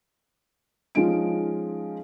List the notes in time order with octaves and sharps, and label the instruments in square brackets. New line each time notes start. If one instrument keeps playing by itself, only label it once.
[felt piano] F3 G#3 C#4 D#4 F4 D7